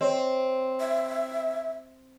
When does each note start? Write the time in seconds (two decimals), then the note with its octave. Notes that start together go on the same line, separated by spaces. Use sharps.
0.01 C4 C#5 D#5
0.80 E5